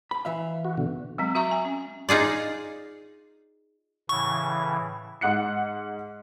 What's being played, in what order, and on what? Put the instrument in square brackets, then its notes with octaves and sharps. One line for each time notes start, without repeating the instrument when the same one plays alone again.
[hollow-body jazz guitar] B5
E3 E5 F5
[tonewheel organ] F#4
B2 D3
[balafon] F#3 G#3 C4
F#4 E5 A#5 C#6
G#5
C#4
[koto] D#4 F4 G#4 D5
[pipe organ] A2 C#3 E3 [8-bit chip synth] C#6
[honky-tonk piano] G#2 F#5 F#6 C#7